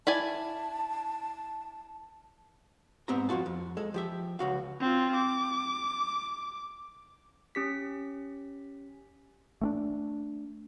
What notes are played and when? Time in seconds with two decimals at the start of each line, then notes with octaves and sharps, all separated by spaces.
0.07 E4 D5 G#5 A5
3.08 G#2 B3 C4 G4 E5 A#5
3.29 F2 F#3 F4 F#4 A5
3.46 F2
3.77 G#3 A4
3.94 F3 G4 E5
4.39 C#2 F#4 F5
4.80 C4 F4
5.15 D6
7.55 C#4 G4 B6
9.61 A3 C4 D4